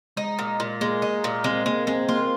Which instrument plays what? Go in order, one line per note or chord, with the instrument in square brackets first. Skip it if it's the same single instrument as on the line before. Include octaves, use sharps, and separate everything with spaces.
[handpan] G#3 [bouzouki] D#4
[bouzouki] A#2
A#2
[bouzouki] G#3 [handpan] A#3
[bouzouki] D#4
A#2
[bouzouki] G#3 [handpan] C4
[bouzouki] G#3 [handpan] A#3
[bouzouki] G#3 [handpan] C4
[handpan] A#3 [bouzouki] F4